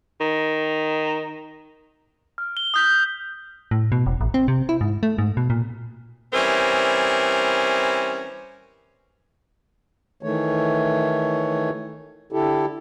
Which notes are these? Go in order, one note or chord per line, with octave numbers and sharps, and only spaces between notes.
D#3
F6
G7
D#6 G6 B6
A2
B2
F1
A1
C4
C3
E4
G#2
A3
G#2
B2
A#2
E3 G3 C4 C#4 A#4 E5
D#3 E3 A3 C#5
D3 E4 G4 A4